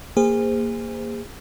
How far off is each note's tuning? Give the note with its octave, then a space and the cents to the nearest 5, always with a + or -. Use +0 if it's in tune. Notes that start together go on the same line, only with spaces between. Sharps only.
A#3 -10 G#4 -30 C5 -20